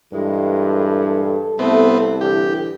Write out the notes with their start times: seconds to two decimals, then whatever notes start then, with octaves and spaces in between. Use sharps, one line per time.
0.14 G2 A#2 E3 G#3 A4
1.59 C2 A3 B3 C4
2.21 A2 D3 E3 G4